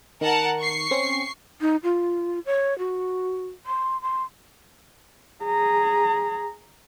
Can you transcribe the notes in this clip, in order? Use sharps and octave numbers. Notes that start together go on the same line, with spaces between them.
D#3 A#4 F#5 A5
C#6 C7
C4 C#4
D#4
F4
C#5
F#4
C6
C6
G#4 A#5